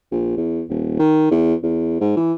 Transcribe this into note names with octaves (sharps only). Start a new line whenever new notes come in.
A#1
E2
D#1
D#3
E2
E2
G#2
E3